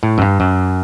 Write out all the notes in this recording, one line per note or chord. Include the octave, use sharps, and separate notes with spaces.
A2
F#2
G2
F#2